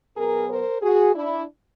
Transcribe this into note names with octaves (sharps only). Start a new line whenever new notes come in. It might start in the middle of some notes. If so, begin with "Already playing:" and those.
B2 F#3 B3 G#4 A#4
A#4 C5
F#4 G#4
D4 E4